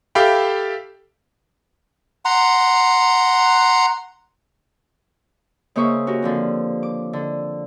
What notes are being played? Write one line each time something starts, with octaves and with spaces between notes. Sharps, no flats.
G4 A4 E5 F5 G5 B5
F#5 A#5 C6
C#3 A#3 C5 E5 C#6 D#6
C#4 F#4 G4 A#4
D3 F3 C4
D6
D3